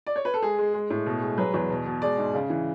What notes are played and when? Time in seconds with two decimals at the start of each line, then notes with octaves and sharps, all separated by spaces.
0.07 D5
0.16 C#5
0.25 B4
0.34 A4
0.42 G#3 G#4
0.58 G#3
0.74 G#3
0.90 A2
1.06 B2
1.21 G#3
1.37 F#3 B4
1.54 E2
1.70 B2
1.86 B2
2.02 G#3 D5
2.18 G#2
2.34 C#3
2.50 E3